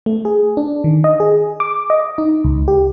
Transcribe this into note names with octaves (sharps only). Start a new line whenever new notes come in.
A3
G#4
D4
D#3
D#5
G#4
D6
D#5
D#4
C#2
G4